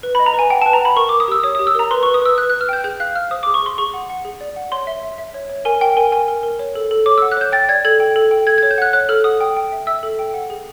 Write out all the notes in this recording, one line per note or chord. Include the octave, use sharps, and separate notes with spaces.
B4
B5
D#5
A#5
B4 G#5
F#5 G5
A5
B4
A#5
F#5 B5
A#4 C#6
A#4 D6
D#6
G4 E6
C#5 D#6
D#6
G4
E6
A#4 A#5
B4 C6
B4 C#6
D#6
B4 E6
B4 F#6
F#6
B4
F6
G5 G6
G#4 G6
F5 F#6
F5 F6
C5 D#6
D6
G#4
C#6
G#4 C6
G#4 C#6
F#5
F#5
G#4
D5
F#5
C#5 C6
E5
E5
E5
C#5
C#5
A#4 G#5
A#4 G5
A#4 G#5
A#4 G#5
A#4
A#4
C#5
A4
A4
C#5 D6
E6
F#5
F#6
C#5 G6
G5 A6
D5 G#6
A4 G#6
G5
A4
G5
A4 G#6
G#6
C#5
G6
F#5 F#6
C#5 F#6
A4 F6
F#5 D#6
G5
G5
E5
E5 E6
A4
G5
F#5
G#4